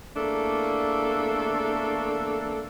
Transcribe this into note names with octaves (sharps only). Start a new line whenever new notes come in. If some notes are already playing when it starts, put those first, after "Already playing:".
E2 A3 A#3 D4 A4